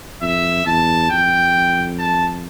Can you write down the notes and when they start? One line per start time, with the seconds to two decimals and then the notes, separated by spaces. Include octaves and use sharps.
0.22 F2 E5
0.66 E2 A5
1.10 F2 G5
1.99 A5